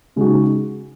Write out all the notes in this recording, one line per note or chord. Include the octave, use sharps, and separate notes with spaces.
C#3 G#3 D#4 F#4